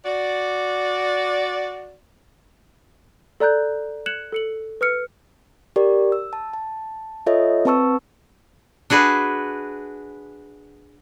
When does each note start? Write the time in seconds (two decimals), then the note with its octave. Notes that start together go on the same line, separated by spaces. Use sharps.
0.06 F#4 D5
3.40 A4 D5 A#5 F#6 G6
4.06 F#6 G#6 C#7 E7 F#7
4.32 A4 C#7 F#7
4.81 B4 E6 F6 C#7
5.76 G4 A#4 D5
6.12 E6
6.33 A5
6.53 A5
7.26 F4 A4 C#5 D#5 E5
7.65 C4 B4 A5 C#6 E6
8.90 D4 F#4 G#4 B4